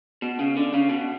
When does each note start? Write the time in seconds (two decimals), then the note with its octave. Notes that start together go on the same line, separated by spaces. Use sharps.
0.22 B2
0.39 C#3
0.57 D3
0.74 C#3
0.90 B2